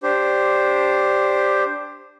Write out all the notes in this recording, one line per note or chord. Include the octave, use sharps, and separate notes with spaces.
D4 G4 C5